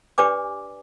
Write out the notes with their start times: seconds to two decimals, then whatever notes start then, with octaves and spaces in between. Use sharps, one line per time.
0.18 D4 G4 B4 D5 G#5 D6